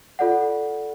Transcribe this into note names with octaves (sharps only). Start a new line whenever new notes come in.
F4 A4 D5 F#5